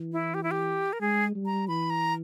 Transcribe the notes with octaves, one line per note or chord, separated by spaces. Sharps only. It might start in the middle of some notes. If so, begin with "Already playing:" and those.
Already playing: E3
E4
G4
E4
G4
A#4
G#3 G#4
G3
A#5
E3 B5
A#5